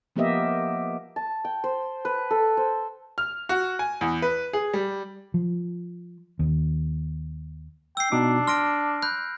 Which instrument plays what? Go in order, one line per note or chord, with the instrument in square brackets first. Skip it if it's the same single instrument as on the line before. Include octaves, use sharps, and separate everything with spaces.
[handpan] F3 A#3 B3 G4 D#5 E5
[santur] A5
G5
C5
B4
A4
C5
[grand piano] F6
F#4
G#5
E2
B4
G#4
G3
[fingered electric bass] F3
D#2
[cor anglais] G5 [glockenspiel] E6 C7
[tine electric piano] B2 D#4 D6 [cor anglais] D4
[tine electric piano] C6 [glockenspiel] F6 A#6 D7
[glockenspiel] B5 F#6 G6